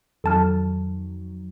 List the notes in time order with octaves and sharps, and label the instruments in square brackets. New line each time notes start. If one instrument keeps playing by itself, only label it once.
[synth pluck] F2 D#3 F#3 [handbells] A4 A5 F6